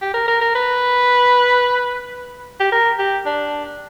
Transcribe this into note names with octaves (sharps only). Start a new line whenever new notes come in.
G4
A#4
A#4
A#4
B4
G4
A#4
G4
D4